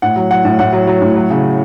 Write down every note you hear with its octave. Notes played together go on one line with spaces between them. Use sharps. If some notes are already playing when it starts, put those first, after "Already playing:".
A2 F#5
F#3
F#3 F#5
A2
A2 F#5
F#3
F#3
A2
F#3
C#3